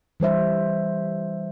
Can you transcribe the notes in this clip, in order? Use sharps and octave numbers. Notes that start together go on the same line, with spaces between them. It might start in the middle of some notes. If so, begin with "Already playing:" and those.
E3 G3 C5 E5